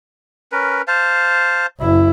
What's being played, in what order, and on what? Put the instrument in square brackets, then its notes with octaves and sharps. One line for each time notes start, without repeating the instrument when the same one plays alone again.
[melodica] C#4 A#4 B4
C5 F5 A5
[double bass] F#1 E4